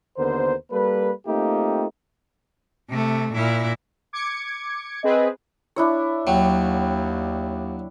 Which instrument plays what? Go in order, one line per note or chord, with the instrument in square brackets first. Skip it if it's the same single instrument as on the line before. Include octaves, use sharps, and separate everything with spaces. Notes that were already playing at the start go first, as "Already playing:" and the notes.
[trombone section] D#2 D3 B3 A#4 C5
G3 A#3 A4 B4
A3 A#3 C4 D#4 F4 G4
[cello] C3 A3
A#2 E4
[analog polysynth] D6 G#6 C#7
[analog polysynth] C4 G#4 B4 [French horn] D#5
[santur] D4 E4 C#5
[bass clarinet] D#2 [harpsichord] F#3 [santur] G5